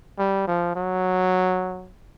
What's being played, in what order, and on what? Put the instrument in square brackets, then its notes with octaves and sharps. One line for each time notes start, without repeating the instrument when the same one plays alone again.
[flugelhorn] G3
F3
F#3